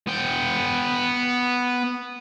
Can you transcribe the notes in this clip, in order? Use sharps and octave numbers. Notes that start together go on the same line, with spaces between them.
B3 G5